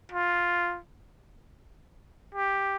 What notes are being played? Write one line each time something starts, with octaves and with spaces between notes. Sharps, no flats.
F4
G4